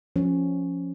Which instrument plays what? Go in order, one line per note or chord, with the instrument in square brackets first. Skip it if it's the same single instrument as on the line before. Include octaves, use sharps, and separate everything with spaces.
[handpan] F3 C#4